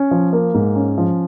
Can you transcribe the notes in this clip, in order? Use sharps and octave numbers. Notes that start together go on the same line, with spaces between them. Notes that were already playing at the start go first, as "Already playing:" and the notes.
Already playing: C#4
F3
A#3
G#2
C#4
F3